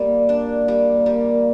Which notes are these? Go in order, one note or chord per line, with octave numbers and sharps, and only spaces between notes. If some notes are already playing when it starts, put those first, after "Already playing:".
Already playing: G3 A#3
D4
G3
G3